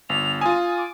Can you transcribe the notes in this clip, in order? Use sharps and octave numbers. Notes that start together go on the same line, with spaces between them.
G1 F7
F4 G#5 D#6
D6